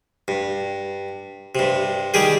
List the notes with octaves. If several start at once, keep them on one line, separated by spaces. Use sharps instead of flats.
G2
G2 C3
D#3 G3 G4 G#4